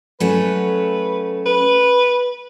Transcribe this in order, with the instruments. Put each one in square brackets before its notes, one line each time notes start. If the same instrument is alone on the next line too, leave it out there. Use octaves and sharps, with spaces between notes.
[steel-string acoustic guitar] F#3 A3 C#4 [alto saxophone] B4
[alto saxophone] B4